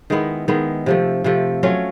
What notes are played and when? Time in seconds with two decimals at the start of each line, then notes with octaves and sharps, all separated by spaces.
0.10 D#3 G#3 B3 E4
0.48 D#3 G#3 B3 E4
0.86 C3 F3 A3
1.24 C3 F3 A3
1.63 F#3 A3 C#4 F4